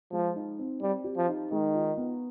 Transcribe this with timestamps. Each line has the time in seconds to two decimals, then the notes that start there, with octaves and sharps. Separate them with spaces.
0.12 F3 G#3
0.36 D#4
0.59 C4
0.82 G3 C4
1.04 G4
1.17 F3
1.28 D#4
1.51 D#3 G#3
1.75 F4
1.97 B3